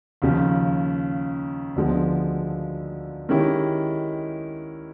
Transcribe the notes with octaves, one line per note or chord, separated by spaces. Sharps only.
D#2 C#3 F3
D2 D3 F3 G#3 B3
D#3 G#3 C#4 E4 G4